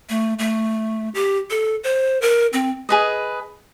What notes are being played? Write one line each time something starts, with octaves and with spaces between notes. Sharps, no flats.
A3
A3
G4
A4
C5
A#4
C4
G#4 B4 D#5